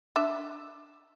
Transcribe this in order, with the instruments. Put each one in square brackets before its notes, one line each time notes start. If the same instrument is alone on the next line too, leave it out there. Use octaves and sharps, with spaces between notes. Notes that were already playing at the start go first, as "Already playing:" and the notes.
[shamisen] D4 E5